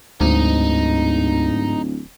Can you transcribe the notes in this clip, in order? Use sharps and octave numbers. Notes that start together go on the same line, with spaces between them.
D1 D2 G#2 D#4